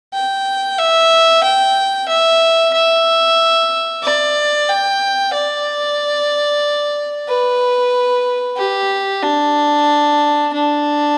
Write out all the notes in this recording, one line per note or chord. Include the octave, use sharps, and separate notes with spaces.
G5
E5
G5
E5
E5
D5
G5
D5
B4
G4
D4
D4